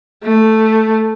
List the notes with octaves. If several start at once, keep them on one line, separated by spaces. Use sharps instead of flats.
A3